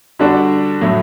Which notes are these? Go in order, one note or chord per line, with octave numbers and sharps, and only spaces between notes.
D3 G3 D4 F#4
A2 F#3 A3